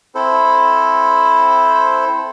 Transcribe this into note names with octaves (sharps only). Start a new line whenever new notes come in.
C4 E4 A4 C5